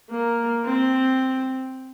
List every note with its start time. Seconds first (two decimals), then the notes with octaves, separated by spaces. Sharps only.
0.10 A#3
0.65 C4